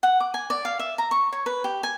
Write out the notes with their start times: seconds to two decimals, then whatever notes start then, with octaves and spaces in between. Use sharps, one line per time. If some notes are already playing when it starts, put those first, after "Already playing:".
0.03 F#5
0.20 D6
0.34 G#5
0.50 D5
0.65 F5
0.79 E5
0.98 A#5
1.11 C#6
1.33 C#5
1.46 B4
1.64 G4
1.83 G#5